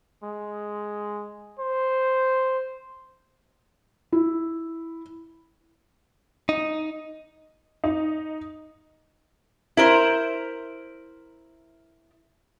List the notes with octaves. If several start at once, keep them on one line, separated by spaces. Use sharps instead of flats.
G#3
C5
E4
D#4
D#4
E4 A#4 C5